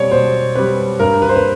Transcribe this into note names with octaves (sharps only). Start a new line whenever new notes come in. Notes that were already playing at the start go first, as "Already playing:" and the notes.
Already playing: B2 G3 C4 C#5 D5
B2 C5
G3 C4 B4
G2 A#4
B4
C5
B4